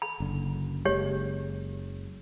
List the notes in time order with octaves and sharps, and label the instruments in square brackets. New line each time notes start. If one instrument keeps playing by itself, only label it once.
[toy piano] B5
[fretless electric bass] F#1 D3
[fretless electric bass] F#1 G#3 [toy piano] G4 C#5